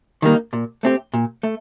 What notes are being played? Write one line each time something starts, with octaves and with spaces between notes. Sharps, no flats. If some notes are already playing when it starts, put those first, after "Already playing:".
D#3 G3 A#3 D#4
A#2
A3 C4 G4
A#2
A3